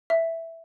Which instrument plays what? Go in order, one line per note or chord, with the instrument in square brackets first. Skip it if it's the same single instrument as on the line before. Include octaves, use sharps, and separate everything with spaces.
[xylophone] E5